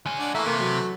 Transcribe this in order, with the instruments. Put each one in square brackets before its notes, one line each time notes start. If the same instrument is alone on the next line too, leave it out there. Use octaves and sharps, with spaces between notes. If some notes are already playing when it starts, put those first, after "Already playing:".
[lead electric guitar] G#3 C#4
[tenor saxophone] D4 [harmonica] D5 F#5
[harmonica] E3 A3 [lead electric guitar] A#3 [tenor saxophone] E5
[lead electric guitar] C3 [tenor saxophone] A#3
[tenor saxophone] F#3